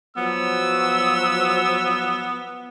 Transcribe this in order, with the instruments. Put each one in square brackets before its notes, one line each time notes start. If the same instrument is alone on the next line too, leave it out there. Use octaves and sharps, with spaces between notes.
[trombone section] F3 F#3 [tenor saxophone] B3 [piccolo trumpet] E6